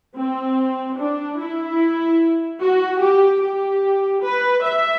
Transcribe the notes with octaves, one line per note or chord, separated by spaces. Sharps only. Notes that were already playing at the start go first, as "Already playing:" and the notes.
C4
D4
E4
F#4
G4
G4
B4
E5